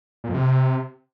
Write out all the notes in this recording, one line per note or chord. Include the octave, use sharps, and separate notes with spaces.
A#2
F2
C3